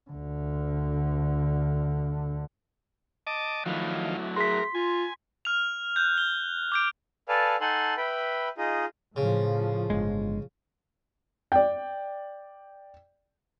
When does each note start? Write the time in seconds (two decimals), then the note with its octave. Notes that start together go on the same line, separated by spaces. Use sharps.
0.11 D2 D3
3.27 D#5 A5 D6
3.66 D#3 F3 F#3 A3 E4
4.36 G#4 A#4 C6 B6
4.75 F4 G#5
5.45 F6 F7
5.96 F#6 G6
6.18 G7
6.72 D6 G6 D7
7.28 A4 B4 D5 F5 G#5 A5
7.61 D#4 A4 F#5 G#5 A5 C6
7.97 B4 E5 G5 B5
8.58 D#4 F4 G#4 D#5
9.16 A2 C#3 F3
9.90 G1 G#3
11.52 D5 G5